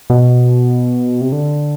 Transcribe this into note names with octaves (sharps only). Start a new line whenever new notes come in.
B2
C3
D3